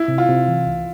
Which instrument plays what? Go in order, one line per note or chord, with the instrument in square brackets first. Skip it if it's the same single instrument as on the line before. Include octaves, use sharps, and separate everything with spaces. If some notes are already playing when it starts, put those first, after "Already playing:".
Already playing: [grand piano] E4
[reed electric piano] C3
[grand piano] F4
[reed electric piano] C3
E3
C2